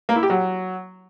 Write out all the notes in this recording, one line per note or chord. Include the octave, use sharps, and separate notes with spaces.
A#3
E4
G4
F#3